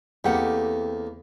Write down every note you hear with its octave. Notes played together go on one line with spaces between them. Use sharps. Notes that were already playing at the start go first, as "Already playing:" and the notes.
E2 A3 A#3 C4 G4 F#5